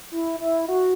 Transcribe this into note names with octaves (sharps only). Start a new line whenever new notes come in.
E4
E4
F#4